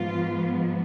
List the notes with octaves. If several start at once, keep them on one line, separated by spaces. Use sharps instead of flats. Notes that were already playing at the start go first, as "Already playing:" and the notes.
Already playing: G#2 F3 B3 F4